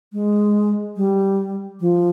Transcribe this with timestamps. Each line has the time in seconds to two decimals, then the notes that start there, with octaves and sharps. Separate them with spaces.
0.13 G#3
0.96 G3
1.80 F3